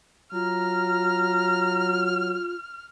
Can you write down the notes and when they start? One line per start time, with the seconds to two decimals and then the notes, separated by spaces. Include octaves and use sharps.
0.33 F#3 F4 A#5 F6